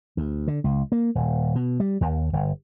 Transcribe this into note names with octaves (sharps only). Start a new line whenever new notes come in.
D2
D3
C#2
A#3
D#1
B2
G3
D#2
G1